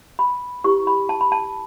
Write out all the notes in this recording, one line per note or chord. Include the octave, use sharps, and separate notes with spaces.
B5
E4 G4 B4 C#6
B5
A5
B5
A5